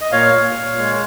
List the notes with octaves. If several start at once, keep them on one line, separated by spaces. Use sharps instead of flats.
D#5
A#2 C#5 F5
A#2
A#2
G#3